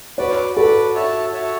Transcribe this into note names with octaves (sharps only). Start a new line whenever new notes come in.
F#4 B4 C#5 D5
F#4 A4 B4 D5
F#4 C#5 E5 A5
F#4 C#5 E5 A5